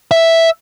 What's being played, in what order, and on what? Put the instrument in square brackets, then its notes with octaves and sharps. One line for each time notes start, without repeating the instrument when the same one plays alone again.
[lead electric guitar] E5